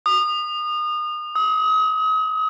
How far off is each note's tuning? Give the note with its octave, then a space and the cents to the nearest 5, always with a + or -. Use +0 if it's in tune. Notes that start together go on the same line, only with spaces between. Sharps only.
D#6 -30
D#6 +40